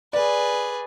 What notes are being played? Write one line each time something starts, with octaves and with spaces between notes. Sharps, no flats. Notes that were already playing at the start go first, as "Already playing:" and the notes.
G#4 B4 D5